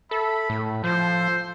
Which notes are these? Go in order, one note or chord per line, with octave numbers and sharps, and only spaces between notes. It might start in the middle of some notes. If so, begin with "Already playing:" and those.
A4 E5 B5
A2
F3 A4 C5